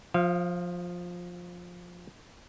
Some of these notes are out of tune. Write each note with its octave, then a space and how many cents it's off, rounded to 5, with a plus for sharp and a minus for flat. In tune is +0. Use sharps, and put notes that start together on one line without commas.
F3 +15 F5 -30